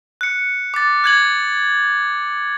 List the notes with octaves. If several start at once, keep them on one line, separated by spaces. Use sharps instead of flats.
F#6 C#7
D6 A6
F#6 G#6 F#7